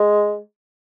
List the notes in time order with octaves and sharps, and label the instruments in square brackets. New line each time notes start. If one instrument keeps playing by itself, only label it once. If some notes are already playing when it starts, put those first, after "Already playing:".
Already playing: [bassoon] G#3